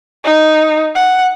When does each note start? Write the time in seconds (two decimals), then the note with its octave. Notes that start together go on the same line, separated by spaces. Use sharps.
0.24 D#4
0.95 F#5